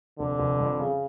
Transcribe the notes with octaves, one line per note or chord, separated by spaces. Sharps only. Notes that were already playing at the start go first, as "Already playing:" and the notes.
F1 D3
F1
F2
C#3